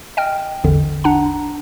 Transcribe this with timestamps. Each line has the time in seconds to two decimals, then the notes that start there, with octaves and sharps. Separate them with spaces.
0.17 D#5 G5 F6
0.64 A1 E2 D3
1.04 D4 F#5 A#5